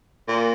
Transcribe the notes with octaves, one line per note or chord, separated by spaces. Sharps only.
A#2